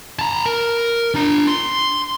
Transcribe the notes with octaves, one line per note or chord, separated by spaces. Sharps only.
A5 A#5
A#4
D4 A#5
C6